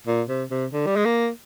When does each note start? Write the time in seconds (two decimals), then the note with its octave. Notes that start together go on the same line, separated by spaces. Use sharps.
0.07 A#2
0.28 C3
0.50 C3
0.73 D3
0.86 G3
0.96 G#3
1.05 A#3